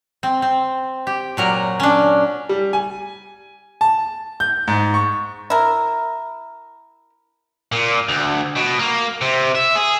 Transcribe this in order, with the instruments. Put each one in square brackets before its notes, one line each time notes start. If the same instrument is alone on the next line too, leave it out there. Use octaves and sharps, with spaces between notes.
[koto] C4
C4
G4
A#2 F#3 A#4
C#4 D4
[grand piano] G3
G#5
A5
G6
G#2
C#6
[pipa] E4 A#4
[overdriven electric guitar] A#2
D2
B2
A#3
C3
E5
G#4